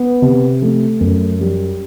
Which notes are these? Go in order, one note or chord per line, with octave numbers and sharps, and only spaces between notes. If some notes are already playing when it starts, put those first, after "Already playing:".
Already playing: B3
C3
A3
F#2
G3